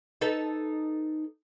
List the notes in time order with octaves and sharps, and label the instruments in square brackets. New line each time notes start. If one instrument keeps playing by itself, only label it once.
[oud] D#4 A4 B4